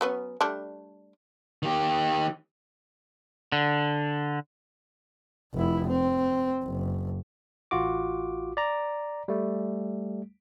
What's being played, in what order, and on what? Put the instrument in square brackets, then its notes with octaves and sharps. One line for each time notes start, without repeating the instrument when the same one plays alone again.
[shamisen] F#3 B3 C#4
G3 A3 D4
[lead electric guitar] D#3 G4
[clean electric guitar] D3
[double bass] F1 E4
C4
F#1
[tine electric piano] A1 F4 F#4 D6
D5 A#5
G3 A3